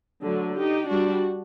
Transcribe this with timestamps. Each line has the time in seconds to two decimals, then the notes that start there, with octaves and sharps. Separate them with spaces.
0.22 D3 F#3 A3
0.55 D#4 G4
0.88 G3 D4 F#4